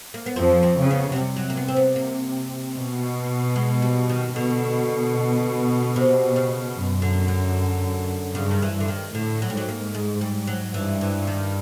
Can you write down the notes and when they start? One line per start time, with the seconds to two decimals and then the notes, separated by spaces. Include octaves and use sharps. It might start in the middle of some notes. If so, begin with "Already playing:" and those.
0.14 A#3
0.26 B3
0.36 F2 F3 C4
0.63 C4
0.77 C#3
0.91 B3
1.12 F#3
1.16 C3 G3
1.36 F#3
1.50 A#3
1.57 B3
1.68 C4
1.76 B3
1.96 A#3
2.77 B2
3.56 G#3
3.82 G3
4.09 D#3
4.36 B2 D3
5.96 C3
6.36 C#3
6.75 F#2
7.02 D3
7.28 D3
8.35 G2 C#3
8.51 D#3
8.62 E3
8.75 G2
8.80 D3
8.88 D#3
9.14 A2 D3
9.42 F#3
9.50 G3
9.55 G#2 F#3
9.68 A#3
9.95 G#3
10.21 G3
10.47 F#3
10.74 G2 E3
11.01 E3
11.27 D#3